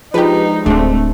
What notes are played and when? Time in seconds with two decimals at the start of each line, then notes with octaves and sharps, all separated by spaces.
0.14 F3 G#3 D4 D#4 G4 B4
0.66 D1 G#3 A3 C4 D4 F4